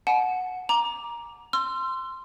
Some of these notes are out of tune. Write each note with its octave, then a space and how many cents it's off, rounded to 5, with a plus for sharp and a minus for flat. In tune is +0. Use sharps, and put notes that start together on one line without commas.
F#5 -10 A5 -40
A#5 +15 D6 +0
C6 +0 E6 +45